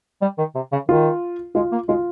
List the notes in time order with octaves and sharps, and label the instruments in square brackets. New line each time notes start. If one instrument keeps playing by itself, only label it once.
[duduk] G3
D#3
C3
C#3
[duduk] D#3 [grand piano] F4
[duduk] G#3 [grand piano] F4
[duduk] A#3
[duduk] G#3 [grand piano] F4